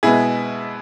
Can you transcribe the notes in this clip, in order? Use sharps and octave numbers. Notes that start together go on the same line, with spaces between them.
B2 G#3 B3 E4 G#4